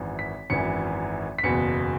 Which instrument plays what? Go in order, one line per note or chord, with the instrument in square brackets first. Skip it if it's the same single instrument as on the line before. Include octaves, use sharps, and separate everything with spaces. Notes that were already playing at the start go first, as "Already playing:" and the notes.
Already playing: [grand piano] G#1 F#2 E3
B6
G#1 F#2 E3 C#7
B6
F#1 E2 B2 C#7